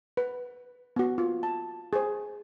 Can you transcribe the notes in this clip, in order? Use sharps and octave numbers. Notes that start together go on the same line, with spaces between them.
B4
B3 F#4
F4
A5
G#4 C5